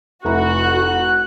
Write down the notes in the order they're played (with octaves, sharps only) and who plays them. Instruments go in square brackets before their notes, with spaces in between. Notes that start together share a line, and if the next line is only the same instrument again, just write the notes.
[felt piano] F1 E4 A#5 [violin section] F#4 [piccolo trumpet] F#6